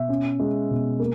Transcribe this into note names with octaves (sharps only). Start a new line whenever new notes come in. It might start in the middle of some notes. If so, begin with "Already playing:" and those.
Already playing: B2 E5
C#4
G#3
B2
A#3